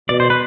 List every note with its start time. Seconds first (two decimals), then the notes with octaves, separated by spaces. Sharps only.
0.09 B2 D5
0.20 C5
0.30 B4